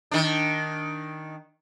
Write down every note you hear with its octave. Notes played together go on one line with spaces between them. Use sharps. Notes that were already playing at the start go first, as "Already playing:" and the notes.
D#3 D4